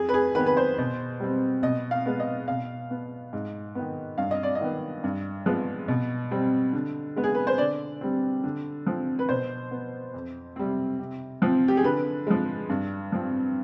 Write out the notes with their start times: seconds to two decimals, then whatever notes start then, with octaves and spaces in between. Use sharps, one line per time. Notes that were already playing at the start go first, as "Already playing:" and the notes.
Already playing: F2 G#4
0.09 B4
0.14 G#4
0.35 D#3 B3 B4
0.46 B4
0.57 C5
0.78 B2
1.20 G3 C4
1.63 B2 D#5
1.91 F5
2.06 G#3 B3
2.20 D#5
2.48 B2 F5
2.91 B3
3.33 G#2
3.75 D#3 B3
4.18 G2 F5
4.31 D#5
4.43 D5
4.55 D#5
4.61 D#3 B3
5.04 G2
5.46 F3 G#3 B3
5.88 B2
6.31 G3 C4
6.73 D3
7.16 G#3 B3
7.24 G#4
7.35 B4
7.47 C5
7.58 D3 D5
8.01 G3 C4
8.44 D3
8.86 F3 C4
9.19 B4
9.29 B2 C5
9.71 B3
10.14 F2
10.56 C3 G3 C4
10.99 C3
11.42 F3 C4
11.68 G4
11.77 G#4
11.84 D3 B4
12.27 F3 G#3
12.69 G2
13.12 F3 C4